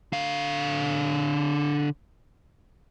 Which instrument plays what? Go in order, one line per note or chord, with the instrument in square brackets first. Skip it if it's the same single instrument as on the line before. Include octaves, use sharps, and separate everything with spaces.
[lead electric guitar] D3 F5